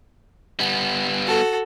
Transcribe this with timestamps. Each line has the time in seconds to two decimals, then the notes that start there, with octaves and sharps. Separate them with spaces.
0.60 G3 B3
1.27 F#4 A4